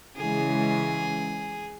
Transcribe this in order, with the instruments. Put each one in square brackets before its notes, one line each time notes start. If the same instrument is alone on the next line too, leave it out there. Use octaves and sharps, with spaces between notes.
[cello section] C#3 E3 G#3 [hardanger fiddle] G#4